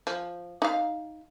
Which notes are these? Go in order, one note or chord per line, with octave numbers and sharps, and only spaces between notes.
F3
D#4 F5